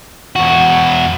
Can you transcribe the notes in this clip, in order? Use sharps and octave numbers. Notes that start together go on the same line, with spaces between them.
E2 F#4